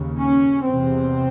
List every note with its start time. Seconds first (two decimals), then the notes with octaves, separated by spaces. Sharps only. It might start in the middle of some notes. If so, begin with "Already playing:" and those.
Already playing: D#2 C#3
0.18 C#4
0.65 E2 C3 C4